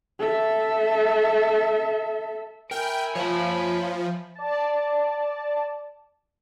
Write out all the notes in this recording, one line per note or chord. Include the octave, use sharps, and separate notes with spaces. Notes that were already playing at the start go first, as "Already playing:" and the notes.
A4 E5
A#4 E5 G5 G#5 B5
F3 C#5 A5
D5 A5